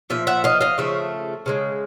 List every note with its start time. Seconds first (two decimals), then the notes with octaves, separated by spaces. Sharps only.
0.10 A#2 F3 E5
0.27 E5 F#5
0.44 D#5 F5
0.61 D#5 F5
0.78 C#3 F3 A3 E5
1.46 C#3 E3 G#3